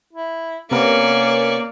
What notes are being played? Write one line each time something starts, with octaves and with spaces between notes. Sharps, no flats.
E4
C3 A#3 B3 C#4 A#4 D5 C#6